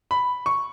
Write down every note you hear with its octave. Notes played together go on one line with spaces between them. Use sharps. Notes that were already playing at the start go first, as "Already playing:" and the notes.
B5
C#6